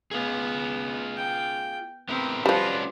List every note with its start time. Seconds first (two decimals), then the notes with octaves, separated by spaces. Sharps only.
0.11 B3 F4 G#4
1.17 G5
2.09 B3 C4 E4 A#4
2.46 F3 G3 C#4 D4 F4 F#4 B4